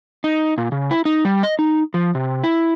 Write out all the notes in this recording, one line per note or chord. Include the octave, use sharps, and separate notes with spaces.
D#4
A#2
C#3
E4
D#4
G3
D#5
D#4
F3
C3
E4